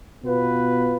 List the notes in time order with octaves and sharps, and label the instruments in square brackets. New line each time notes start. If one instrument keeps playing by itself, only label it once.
[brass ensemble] B2 B3 F4 B4